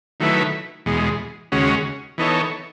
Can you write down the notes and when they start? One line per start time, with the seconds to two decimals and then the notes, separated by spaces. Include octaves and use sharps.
0.20 D#3 F#3 A3 E4 B4
0.86 E2 B2 G#3
1.52 D#2 C#3 G#3 C#4 F#4
2.18 E3 B3 D#4 A4 C#5